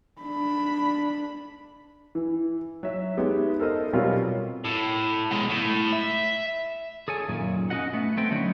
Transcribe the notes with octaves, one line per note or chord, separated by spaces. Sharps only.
D4 B5
E3
F#3 E5
G#3 B3 D#4 G4 E5
A4 A#4 C5 D#5
B2 F#3 G3 C4 F4 A#4
A2
B2 G#3
A2
E5
G#4 A4 C#5 G#5
F#2 A#2 D#3
C#4 D#4 E4 F#4 D#5 F#5
A3 B3
A3 B3 C4 G5
D3 F#3 B3 C#4 D#4